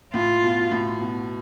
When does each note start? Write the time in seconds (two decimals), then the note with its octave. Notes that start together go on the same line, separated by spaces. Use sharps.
0.14 A2 F4
0.43 B2
0.71 A2
1.01 B2